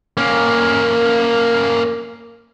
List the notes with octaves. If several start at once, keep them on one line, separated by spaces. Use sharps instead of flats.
A#3 C#4